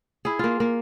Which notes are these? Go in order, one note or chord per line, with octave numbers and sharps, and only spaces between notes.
E4 G#4
A#3 F4
A#3